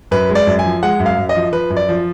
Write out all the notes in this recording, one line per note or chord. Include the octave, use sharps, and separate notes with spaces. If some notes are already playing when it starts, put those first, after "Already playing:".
F#2 B4
G#3
D5
F#2
G#5
F3
G#3 F#5
F#2
F5
F#2
D#5
F3
F3 B4
F#2
D5
F3